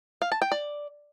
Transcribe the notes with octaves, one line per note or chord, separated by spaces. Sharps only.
F5
A5
G5
D5